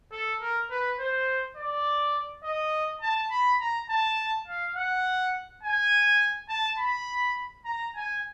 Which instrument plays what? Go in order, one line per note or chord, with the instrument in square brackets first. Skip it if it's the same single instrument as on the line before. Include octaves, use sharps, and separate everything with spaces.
[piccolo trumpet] A4
A#4
B4
C5
D5
D#5
A5
B5
A#5
A5
F5
F#5
G#5
A5
B5
A#5
G#5